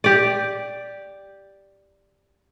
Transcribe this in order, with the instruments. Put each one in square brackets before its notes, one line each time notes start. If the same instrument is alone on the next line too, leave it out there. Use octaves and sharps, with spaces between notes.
[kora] G4 D5